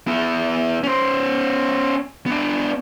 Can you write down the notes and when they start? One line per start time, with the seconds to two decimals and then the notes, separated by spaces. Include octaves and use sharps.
0.07 B3 E4
0.83 C#4 C5
2.26 B3 D4